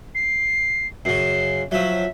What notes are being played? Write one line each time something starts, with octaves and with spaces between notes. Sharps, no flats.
C7
F#2 C#3 C7
F3 F#3 E5